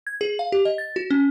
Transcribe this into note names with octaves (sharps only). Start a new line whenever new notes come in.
G#6
G#4
F5
G4
D#5
A6
F#4
C#4